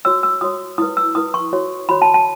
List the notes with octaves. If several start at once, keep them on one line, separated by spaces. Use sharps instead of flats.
F#4 C#5 E6
E6
F#4 C#5 D#6
E4 B4 D#6
E6
E4 B4 D#6
C#6
F#4 C#5
F#4 C#5 B5
A5
A5